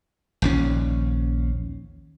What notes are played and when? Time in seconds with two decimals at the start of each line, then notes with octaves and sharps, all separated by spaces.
0.42 A#1 D#2 C#4